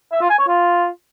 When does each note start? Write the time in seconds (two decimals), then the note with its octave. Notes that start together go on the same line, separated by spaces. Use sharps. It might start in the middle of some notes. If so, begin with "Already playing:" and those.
0.12 E5
0.21 F4
0.30 G#5
0.39 C#5
0.47 F4